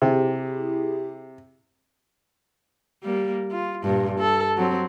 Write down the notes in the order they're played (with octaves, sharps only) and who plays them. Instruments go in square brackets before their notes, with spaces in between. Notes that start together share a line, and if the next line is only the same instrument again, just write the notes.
[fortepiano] C3 [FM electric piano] E4 G4 G#4
[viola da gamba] G3 A#3
F4
G2 A#2
A4
F#3 C4